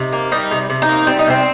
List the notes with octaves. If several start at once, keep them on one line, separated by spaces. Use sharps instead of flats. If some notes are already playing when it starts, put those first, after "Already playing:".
Already playing: C3 D#4
A#3
G3 D#4
C3
C3
D#4
A#3
G3 C4
D#4
C3 C4